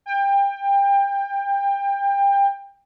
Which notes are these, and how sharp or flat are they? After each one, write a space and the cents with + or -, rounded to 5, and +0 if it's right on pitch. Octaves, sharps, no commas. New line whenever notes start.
G5 +25